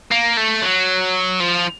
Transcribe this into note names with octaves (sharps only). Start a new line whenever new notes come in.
A#3
A3
F#3
F3